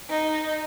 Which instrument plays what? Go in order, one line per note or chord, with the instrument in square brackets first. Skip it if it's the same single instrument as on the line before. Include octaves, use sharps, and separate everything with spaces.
[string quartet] D#4